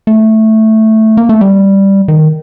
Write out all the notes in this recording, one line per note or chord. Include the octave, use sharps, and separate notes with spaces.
A3
A#3
A3
G3
D#3